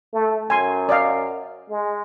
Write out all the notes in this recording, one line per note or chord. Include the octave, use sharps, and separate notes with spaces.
A3
F#2 G#5 C6
D5 D#5 F5
G#3